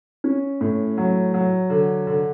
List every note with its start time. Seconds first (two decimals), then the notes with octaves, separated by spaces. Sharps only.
0.24 C#4
0.61 A2
0.97 F#3
1.34 F#3
1.70 D3
2.07 D3